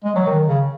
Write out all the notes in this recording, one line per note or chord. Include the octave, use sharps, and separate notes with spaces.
G#3
F#3
D#3
C#3